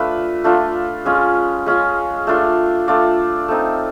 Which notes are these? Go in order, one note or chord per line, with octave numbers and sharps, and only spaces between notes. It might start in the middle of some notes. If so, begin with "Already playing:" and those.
Already playing: A3 D4 F4 B4
A3 D4 F4
G#3 C#4 F4
G#3 C#4 F4
A3 D4 F4
A3 D4 F4 D5
A3 C4 D#4